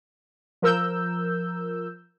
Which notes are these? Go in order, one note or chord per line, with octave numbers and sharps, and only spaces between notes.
F3 A#4 E6 G6